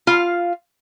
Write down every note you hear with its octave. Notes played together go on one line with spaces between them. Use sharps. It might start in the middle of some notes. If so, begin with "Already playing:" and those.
F4 F5